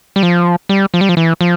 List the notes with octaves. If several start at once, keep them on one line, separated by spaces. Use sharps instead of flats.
G3
F3
G3
F3
G3
F3
E3
F3